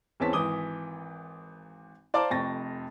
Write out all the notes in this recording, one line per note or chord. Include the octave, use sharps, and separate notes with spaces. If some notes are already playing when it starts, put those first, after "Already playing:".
E2 E3 C4 C#4 A5 B6
G#1 E3 D6 D#6 G7
C5 D5 F5 A5 A#5 D6
F1 F2 G5 C#6 A6 A#6